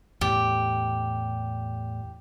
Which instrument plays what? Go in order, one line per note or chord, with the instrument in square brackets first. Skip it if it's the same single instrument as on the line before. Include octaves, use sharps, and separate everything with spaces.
[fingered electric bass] E2 A2 [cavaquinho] G4